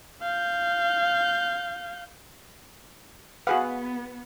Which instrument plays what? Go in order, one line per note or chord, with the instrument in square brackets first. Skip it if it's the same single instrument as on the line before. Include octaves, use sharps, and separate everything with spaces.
[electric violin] F5 G6
[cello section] B3 [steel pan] F#4 G#4 B4 [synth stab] F5 F#5